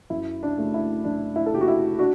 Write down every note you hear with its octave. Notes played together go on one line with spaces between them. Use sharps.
F#2 E4
D4
C#3 F#3 A3
E4
F#2 D4
E4
A4
C#3 F#3 A3 G4
F#4
E4
D4 F#4